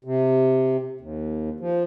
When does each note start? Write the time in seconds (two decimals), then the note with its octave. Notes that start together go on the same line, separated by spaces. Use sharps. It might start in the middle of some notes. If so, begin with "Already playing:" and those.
0.04 C3
1.01 D#2
1.60 F3